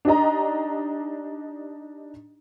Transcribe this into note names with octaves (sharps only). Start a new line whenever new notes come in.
D4 D#4 G4 D#5 A#5